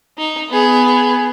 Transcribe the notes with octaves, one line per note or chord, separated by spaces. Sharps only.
D#4
B3 G#4